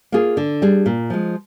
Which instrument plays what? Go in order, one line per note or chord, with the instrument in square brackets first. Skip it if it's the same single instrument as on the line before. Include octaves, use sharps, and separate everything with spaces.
[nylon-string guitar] A#3 F4 G#4
D3
G3 D4 G#4
A#2
F3 G#3